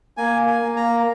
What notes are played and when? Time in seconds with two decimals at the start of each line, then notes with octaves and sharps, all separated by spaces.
0.17 A#3 G#5
0.47 G#5
0.62 A#3
0.76 A#5